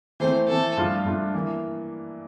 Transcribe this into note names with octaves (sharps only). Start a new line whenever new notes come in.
E3 A3 C4 C5
E3 A3 C4 A4
G2 F3 A3 D4 F4
G2 F3 A3 D4 F4
E3 A#3